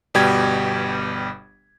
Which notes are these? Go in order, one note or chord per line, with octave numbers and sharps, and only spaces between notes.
G1 B2 G3 G4 G5 G#6